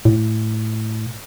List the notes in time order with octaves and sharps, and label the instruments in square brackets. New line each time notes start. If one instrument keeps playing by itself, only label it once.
[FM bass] A2